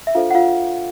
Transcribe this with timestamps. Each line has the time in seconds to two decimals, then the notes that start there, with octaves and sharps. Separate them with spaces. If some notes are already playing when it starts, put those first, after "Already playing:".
0.07 E5
0.15 D4 F4 A4 C5 F5
0.31 F#5
0.35 F4 F5